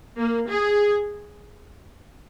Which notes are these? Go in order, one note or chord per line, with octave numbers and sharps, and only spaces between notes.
A#3
G#4